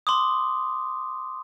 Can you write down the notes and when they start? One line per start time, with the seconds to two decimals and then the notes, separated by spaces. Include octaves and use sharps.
0.07 C6 D6 D#6